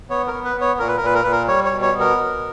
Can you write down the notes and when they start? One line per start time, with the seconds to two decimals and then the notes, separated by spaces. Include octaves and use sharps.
0.10 B3 C#5
0.28 A#4
0.33 B3
0.44 B4
0.56 B3
0.61 C#5
0.79 A#2 A#4
0.88 B4
0.97 A#4
1.02 A#2 B4
1.14 A#4
1.23 A#2 B4
1.32 A#4
1.48 G3 C#5
1.65 C#5
1.71 B2
1.82 C#5
1.94 B3
2.00 A#4
2.17 B2